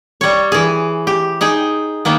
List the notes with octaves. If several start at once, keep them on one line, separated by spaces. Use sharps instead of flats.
G3 C#5
E3 G#4
G4
D#4 G#4 G5
D#3 A#3 B3